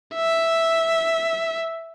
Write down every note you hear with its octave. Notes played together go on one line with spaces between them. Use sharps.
E5